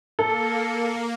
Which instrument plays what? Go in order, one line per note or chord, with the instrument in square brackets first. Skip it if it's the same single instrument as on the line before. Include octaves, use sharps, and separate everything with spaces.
[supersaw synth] A#3 [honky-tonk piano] A4